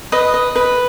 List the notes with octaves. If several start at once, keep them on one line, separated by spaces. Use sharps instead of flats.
B4 D#5
D#5
B4